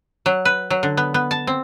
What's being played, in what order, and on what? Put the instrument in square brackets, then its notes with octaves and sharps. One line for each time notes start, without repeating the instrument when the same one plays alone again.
[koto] F#3
B4
F#3
D3
B3
B3
A5
C4